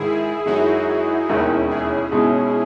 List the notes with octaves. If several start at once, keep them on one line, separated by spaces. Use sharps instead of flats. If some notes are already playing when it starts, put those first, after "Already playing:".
Already playing: G#2 D#3 G#3 E4 G#4
F#2 D#3 G#3 D#4 F#4
E1 D#2 D#3 G#3 C#4 D#4 E4
E4 G#4
B2 G#3 D#4